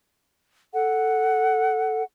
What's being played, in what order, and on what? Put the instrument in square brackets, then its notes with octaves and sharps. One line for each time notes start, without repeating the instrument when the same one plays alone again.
[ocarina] A4 [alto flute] F#5